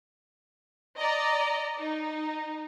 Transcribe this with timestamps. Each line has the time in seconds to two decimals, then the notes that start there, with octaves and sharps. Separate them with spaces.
0.98 D5 D#5 A#5
1.78 D#4